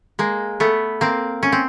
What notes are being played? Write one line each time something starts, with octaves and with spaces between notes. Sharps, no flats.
G#3 A#3
A3 B3
A#3 C4
C#4
C4